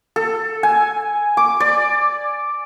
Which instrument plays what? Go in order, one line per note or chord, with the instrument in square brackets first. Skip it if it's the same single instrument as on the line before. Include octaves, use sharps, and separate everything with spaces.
[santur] A4
G#5
D6
D5